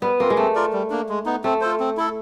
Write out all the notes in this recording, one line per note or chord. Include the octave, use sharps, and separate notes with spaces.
G3 B3
A#3 C4 F4
G#3
A3 C4
F4 A#4 D5
G3
A#3 D4
G#3
B3 D#4
A3 C4
F4 A4 C5
C4
E4 A4